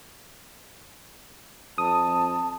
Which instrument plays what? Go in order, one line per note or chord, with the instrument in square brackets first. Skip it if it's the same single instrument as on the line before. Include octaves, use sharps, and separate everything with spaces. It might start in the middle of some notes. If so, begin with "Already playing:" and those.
[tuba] F2 [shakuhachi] A5 [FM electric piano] D#6